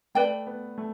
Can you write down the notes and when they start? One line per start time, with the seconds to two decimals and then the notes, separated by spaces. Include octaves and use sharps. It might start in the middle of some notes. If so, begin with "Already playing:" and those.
0.15 A3 B4 D5 G5
0.47 B3
0.78 A3